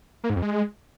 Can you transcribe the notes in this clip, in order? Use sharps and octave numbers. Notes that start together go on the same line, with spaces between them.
A#3
G#2
F2
G#3